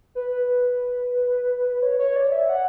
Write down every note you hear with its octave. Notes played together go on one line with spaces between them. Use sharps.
B4
C#5
C#5
D5
E5
F#5